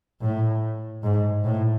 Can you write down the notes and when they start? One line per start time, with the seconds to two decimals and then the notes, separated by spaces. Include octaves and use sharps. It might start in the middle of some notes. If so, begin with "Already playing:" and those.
0.21 A2
1.04 G#2
1.44 A2